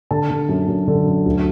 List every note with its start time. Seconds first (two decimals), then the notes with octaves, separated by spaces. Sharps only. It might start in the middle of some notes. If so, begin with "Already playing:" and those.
0.11 D3 A5
0.30 D3
0.49 F#2
0.68 F#2
0.88 D3
1.06 F#2
1.26 D2